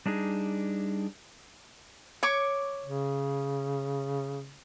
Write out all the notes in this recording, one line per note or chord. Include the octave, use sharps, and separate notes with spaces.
G3 D4 D#4 G#4
C#5 C#6 D6
C#3